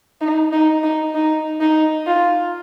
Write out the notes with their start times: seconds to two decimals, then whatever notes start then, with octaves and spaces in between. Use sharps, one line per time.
0.21 D#4
0.52 D#4
0.84 D#4
1.15 D#4
1.61 D#4
2.07 F4